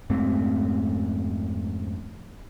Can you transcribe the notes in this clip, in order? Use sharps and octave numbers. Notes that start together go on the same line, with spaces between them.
F2 G#2 A3 C4